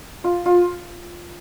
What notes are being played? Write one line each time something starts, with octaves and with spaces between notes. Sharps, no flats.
F4
F4